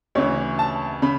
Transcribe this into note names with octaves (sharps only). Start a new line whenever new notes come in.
D2 C#3 E3 C#5
A5
C#3 B5